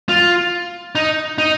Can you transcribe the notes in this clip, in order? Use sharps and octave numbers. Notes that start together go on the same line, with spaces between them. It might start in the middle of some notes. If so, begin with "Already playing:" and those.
F4
D#4
D#4